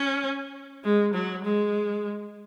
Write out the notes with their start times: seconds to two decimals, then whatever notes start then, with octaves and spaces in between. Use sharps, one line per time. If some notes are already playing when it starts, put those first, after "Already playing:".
Already playing: C#4
0.84 G#3
1.14 F#3
1.45 G#3